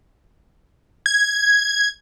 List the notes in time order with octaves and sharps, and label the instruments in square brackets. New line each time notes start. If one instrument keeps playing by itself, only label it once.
[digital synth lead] G#6